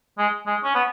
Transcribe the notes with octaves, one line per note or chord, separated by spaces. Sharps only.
G#3
G#3
C#4
B3